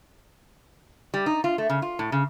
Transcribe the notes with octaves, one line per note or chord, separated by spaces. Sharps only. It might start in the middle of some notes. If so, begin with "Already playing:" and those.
G3
D#4
F4
A3
C#3
F4
A2
C#3